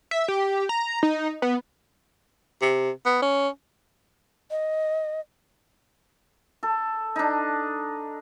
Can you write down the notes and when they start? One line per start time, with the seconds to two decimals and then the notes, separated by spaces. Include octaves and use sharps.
0.11 E5
0.28 G4
0.69 A#5
1.03 D#4
1.42 B3
2.62 C3
3.05 B3
3.22 C#4
4.51 D#5
6.63 A4
7.16 D4 D#4